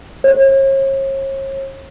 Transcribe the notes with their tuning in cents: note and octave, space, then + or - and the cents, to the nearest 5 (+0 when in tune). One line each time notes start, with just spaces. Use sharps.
C#5 -40